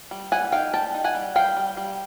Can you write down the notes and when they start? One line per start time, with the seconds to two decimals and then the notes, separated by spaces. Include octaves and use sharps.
0.11 G3
0.32 G3 F#5 G#5
0.52 D#4 F5 G5
0.73 G3 G5 A5
0.94 D#4
1.04 F#5 G#5
1.15 G3
1.35 G3 F5 G5
1.56 G3
1.77 G3